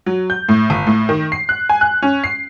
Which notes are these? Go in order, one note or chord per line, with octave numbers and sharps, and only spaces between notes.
F#3
G6
A2
G1
A2
D#3
C7
F#6
G#5
F#6
C#4
C7